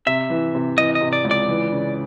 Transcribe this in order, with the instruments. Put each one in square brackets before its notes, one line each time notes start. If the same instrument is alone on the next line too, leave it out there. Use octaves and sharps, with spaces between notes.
[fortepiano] C3 [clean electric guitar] E5
[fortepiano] E3
C3
[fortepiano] E3 [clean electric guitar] D#5
[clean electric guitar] D#5
[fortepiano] C3
[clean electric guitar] D5
[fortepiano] C#2
[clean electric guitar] D5
[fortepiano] E3
C#3